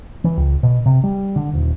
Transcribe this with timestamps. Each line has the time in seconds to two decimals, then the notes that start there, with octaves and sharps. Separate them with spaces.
0.24 E3
0.37 C#2
0.63 B2
0.86 C3
1.04 G3
1.36 D3
1.53 D#1